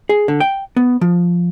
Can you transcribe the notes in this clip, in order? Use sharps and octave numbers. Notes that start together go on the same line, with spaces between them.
G#4
D3
G5
B3
F3